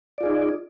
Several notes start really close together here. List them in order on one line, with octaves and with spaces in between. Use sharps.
D5 F4 G#4 D#4